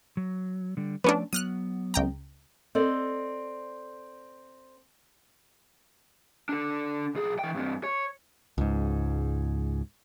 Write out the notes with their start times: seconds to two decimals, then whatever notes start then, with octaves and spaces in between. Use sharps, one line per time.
0.17 F#3
0.77 D3 G3
1.04 F3 A3 B3 C#4 D4 D5
1.33 F#3 B3 D#6 F6 F#6
1.94 C#2 G5 A#5
2.75 C4 A4 D5 D#5
6.49 D4 A4
7.15 B1 G#4
7.39 E3 G5
7.55 G2 C4
7.84 C#5
8.58 C#2 G#2